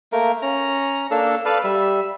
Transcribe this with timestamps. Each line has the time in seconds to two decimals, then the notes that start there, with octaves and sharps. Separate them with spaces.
0.12 A3 A#3 A#4
0.42 C#4 A#5
1.11 A#3 D4 A4
1.45 A4 B4 D5 F5
1.64 G3 E5